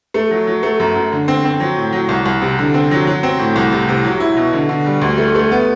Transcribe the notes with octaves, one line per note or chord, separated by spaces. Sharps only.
A3
F#3
F#3
A3
F#2
F#2
D3
C4
C4
F#3
A2
F#3
C2
C2
C3
D3
C4
F#3
F#3
C4
A2
C2
C3
C3
F#3
E4
B2
D3
D3
G3
D2
A3
A3
B3